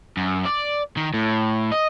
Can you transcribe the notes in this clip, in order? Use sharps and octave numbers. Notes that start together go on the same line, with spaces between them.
F#2
D5
D#3
A2
D#5